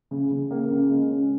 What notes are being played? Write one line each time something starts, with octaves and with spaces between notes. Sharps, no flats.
C#3
C#3
A#3
C#3
G#3
C#4